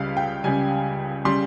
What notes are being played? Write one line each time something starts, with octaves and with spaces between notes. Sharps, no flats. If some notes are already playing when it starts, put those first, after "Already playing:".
Already playing: C#2 C#3 G3 F5
G5
C#2 C#3 G3 G#5
C#3 G3 C6